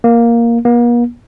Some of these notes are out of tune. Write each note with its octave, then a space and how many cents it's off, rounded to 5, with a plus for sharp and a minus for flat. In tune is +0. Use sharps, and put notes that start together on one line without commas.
A#3 +5
A#3 +45